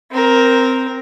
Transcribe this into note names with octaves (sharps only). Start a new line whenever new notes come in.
C4 A#4